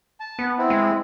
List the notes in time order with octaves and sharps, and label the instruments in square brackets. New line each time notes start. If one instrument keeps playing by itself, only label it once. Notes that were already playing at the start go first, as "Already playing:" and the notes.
[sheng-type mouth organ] A5
[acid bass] B3
[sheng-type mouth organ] C4 E4
[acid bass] G#3